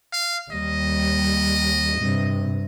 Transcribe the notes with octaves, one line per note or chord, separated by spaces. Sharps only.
F5
D#2 G3 D#5
G2 C3